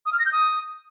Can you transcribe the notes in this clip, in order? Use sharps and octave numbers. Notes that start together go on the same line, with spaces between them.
D#6
F6
A#6
G6
D#6